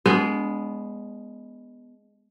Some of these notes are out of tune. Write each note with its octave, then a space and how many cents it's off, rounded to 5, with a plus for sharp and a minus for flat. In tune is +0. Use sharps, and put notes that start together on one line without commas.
G#3 +0 B3 +0 D4 -35